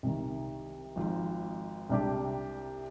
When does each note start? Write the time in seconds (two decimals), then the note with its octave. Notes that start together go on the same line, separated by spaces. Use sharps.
0.03 C2 C3 D#3
0.96 G#1 G#2 F3
1.90 C2 C3 G3 D4 G4